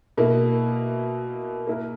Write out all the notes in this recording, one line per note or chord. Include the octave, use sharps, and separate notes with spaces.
B2 A#3 E4
A#3 E4 A#4